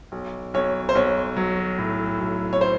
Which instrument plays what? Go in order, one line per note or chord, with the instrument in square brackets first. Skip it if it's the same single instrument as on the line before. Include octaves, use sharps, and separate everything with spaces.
[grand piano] B1
[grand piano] B1 [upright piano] C#5
[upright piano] C5
[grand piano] B1 [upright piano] C#5
[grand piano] F#3
A2
B1
[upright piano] C#5
C5